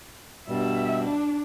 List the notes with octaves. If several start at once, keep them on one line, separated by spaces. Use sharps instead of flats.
G2 B2 G3 E5
D4